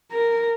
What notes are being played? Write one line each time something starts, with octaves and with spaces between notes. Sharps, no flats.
A#4